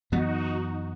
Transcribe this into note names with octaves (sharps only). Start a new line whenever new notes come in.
F#2 E3 B3 D#4 F#4